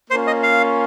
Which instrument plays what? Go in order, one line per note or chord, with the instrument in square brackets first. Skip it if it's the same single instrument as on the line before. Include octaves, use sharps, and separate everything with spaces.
[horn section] A#3 C#4 F4 [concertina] C5
[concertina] D#5
F5